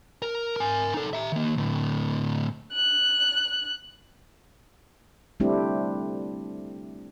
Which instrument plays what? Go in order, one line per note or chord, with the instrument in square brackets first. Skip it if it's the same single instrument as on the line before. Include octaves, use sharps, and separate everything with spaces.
[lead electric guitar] A#4
A#4 G#5
D#4 A4
E5 A#5
D#3 A#3
D2 A2
[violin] F#6
[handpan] G3 A3 C4 D4 E4 G4